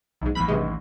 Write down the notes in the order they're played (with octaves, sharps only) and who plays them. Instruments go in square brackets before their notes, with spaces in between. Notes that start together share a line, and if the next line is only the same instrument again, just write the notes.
[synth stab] B1 G#2
[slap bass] A1 D#2 [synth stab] B5 B6
[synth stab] G2 C3 G#3